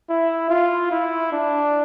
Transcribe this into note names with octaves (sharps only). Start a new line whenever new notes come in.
E4
F4
E4
D4